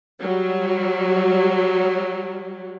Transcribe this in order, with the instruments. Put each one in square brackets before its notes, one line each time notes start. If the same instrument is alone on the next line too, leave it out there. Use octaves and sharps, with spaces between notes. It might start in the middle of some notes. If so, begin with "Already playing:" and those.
[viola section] F#3 G3